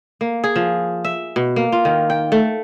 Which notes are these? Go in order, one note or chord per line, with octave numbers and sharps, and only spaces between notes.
A#3
G#4
F3
E5
B2
A#3
F4
D#3
G5
A3